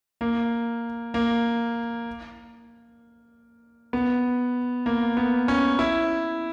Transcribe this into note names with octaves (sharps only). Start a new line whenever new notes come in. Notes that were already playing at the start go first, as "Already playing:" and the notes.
A#3
A#3
B3
A#3
B3
C#4
E4